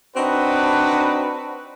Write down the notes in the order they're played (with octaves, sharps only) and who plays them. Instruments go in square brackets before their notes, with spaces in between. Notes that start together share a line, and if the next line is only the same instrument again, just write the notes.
[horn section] C4 D4 D#4 F#4 B4